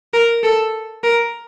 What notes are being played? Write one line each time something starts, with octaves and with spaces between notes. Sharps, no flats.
A#4
A4
A#4